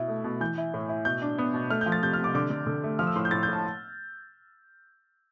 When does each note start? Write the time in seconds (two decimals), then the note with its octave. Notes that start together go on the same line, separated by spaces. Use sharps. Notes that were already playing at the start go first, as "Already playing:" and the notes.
Already playing: B2 E4
0.08 A3
0.24 B2
0.41 E3 G6
0.58 E4
0.74 A2
0.89 E4
1.05 B2 G6
1.22 D4
1.38 B3
1.54 B2
1.70 A3 F6
1.81 F3 G6
1.92 A6
2.03 C3 G6
2.13 C3 F6
2.24 D6
2.35 D3 D6
2.50 D3
2.67 D3
2.84 A3
2.99 F3 F6
3.07 E6
3.16 A2 C6
3.25 G6
3.31 A2 A6
3.43 G6
3.48 A2 A5